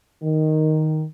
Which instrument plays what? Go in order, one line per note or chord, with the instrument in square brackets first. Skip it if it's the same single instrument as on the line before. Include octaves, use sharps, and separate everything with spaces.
[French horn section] D#3